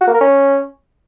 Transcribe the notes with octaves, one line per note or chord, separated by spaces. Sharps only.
F#4
A#3
A#4
C#4